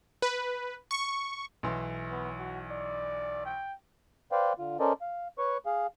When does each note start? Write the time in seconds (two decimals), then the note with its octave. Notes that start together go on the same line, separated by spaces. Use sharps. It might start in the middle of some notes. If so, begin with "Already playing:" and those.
0.22 B4
0.91 C#6
1.63 B1 E3 C6
2.11 B3
2.39 F#4
2.71 D5
3.45 G5
4.32 B4 C5 D5 F5 G5
4.59 D3 F4
4.80 C#4 A4 A#4 C5 D5 D#5
5.01 F5
5.38 B4 C#5 C#6
5.66 G#4 F5